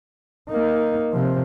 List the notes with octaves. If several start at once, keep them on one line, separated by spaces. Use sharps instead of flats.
A#3 D#4
C3 F3